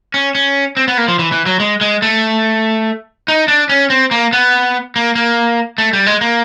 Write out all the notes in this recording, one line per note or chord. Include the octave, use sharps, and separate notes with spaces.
C#4
C#4
C4
B3
A#3
F3
E3
E3
F#3
G#3
G#3
A3
D#4
D4
C#4
C4
A#3
B3
A#3
A#3
A3
G3
G#3
A#3